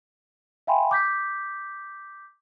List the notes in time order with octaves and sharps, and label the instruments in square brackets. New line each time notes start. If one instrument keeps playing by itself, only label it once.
[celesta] E5 F5 G5 G#5 B5 C6
D6 G6 B6